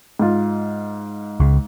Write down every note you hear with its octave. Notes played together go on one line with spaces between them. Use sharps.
G#2 F4
C#2